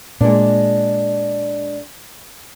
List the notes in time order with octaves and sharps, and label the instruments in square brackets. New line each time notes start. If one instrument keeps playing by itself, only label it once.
[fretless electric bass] A#2 [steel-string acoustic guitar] G#3 D4